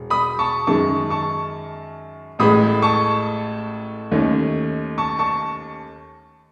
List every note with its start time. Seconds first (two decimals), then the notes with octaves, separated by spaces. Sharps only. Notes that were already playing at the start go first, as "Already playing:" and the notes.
Already playing: E1
0.10 B5 D#6
0.39 A5 C#6
0.67 F#2 D#3 G#3 A5 C#6
1.10 A5 C#6
2.39 A1 A2 G#3 B5 D#6
2.82 A5 C#6
4.12 D#2 D#3 A3 C#4
4.98 A5 C#6
5.19 A5 C#6